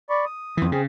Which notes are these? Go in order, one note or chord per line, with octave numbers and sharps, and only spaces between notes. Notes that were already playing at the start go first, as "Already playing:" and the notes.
D5 B5 C#6
D#6
F2 E3
C#3 C4 G#4